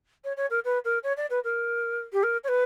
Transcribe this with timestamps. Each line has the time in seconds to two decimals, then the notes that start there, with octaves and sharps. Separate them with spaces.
0.24 C#5
0.37 C#5
0.50 A#4
0.64 B4
0.84 A#4
1.03 C#5
1.17 D5
1.30 B4
1.44 A#4
2.12 G4
2.23 A#4
2.43 C#5
2.48 B4